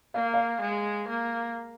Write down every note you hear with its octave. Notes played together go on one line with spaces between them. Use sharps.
A#3 F5
F5
G#3
A#3